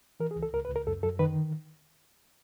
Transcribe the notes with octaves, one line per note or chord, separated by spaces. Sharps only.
E3 A#4
G#4
C#2
A4
C#2 A#4
B4
C#2
A#4
F#2 A4
F#2 A4
D#3 B4